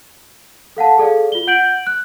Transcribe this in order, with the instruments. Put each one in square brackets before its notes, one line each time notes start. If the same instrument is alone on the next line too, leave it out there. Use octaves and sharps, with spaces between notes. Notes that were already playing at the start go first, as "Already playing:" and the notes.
[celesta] A4 F5 F#5 A5
G#4 A4 D5 F5
F4 G7
F#5 G6 D7 F#7
F#6